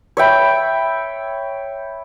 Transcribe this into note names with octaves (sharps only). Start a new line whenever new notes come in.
C#5 E5 G5 B5